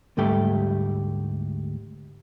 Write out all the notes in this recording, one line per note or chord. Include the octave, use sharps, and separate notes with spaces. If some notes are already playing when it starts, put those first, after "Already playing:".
D2 G#2 G3 A3 G4